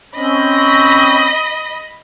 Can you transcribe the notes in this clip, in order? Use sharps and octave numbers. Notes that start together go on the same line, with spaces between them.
C4 C#4 D#5 B5